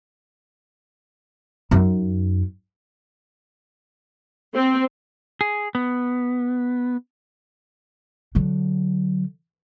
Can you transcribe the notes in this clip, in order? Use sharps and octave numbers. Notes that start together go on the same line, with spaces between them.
F#2 D#4
C4
G#4
B3
D3 F#3